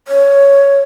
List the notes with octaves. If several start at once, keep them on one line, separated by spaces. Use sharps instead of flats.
C#5